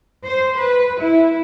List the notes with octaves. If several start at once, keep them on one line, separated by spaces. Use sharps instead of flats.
C5
B4
E4